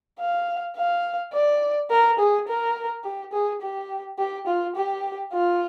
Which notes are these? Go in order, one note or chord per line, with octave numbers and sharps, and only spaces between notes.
F5
F5
D5
A#4
G#4
A#4
G4
G#4
G4
G4
F4
G4
F4